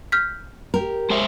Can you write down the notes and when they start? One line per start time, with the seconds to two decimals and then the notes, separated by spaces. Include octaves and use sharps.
0.12 F6 G6 B6
0.74 G4 A#4
1.10 G#3 C5 E5